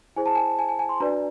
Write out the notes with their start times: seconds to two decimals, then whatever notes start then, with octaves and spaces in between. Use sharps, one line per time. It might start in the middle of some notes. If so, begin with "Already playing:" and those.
0.16 E4 G#4 C5 G#5
0.26 A5
0.35 G#5
0.59 G#5
0.69 G#5
0.79 G#5
0.89 C6
1.00 D4 F#4 B4 D5 A#5